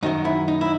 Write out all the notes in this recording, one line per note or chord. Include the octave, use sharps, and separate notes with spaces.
F#2 D#3 F#3 D#4
E4
D#4
E4